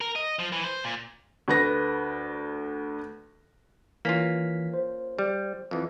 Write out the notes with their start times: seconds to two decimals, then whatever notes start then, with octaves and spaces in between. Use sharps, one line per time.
0.01 A#4
0.16 D#5
0.39 F3
0.52 E3
0.64 C5
0.84 A#2
1.48 D2 B4 A#6
4.05 E3 A#3 C#4 F4 B6
4.74 C5
5.19 G3
5.71 F2 E3